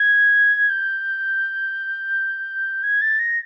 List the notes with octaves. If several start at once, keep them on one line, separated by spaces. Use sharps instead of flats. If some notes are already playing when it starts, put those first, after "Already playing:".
Already playing: G#6
G6
G#6
A6
A#6